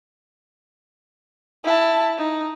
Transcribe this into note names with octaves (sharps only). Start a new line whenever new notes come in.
E4 A5
D#4